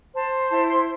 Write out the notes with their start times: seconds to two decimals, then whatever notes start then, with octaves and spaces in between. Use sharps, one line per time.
0.15 C5 A5
0.51 E4 A5
0.69 C6